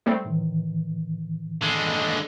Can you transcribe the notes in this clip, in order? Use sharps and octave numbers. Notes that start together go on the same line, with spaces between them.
G3 A3 C4
A2 D#3 E3
D3 G#3 G#5